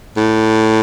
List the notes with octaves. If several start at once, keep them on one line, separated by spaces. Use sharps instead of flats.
A2